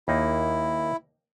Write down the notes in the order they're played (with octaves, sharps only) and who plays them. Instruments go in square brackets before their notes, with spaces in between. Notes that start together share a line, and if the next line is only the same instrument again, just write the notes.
[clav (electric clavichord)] D#2 A#3 D#4 [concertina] E4